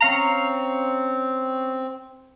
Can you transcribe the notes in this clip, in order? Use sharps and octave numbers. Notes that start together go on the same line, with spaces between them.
C4 C#4 F5 A#5